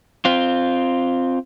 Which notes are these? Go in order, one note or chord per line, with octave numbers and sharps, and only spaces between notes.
C4 F4